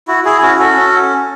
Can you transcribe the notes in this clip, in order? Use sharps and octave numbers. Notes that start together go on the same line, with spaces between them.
E4 F#4
E4 G#4
C#4 F#4
C#4 F#4 A4
C#4